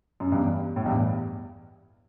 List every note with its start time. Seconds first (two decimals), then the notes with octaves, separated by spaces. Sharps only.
0.20 F#2
0.32 E2 G2
0.76 A2
0.85 E2 G2